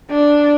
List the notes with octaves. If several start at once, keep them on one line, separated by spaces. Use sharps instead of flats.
D4